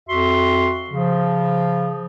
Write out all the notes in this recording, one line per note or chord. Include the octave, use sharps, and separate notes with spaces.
F2 F#4 E5 C6
C#3 F3